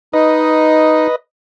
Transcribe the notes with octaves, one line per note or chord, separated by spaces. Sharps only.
D#4 B4 D#5